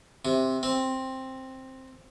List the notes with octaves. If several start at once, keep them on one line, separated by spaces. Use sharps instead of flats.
C3
C4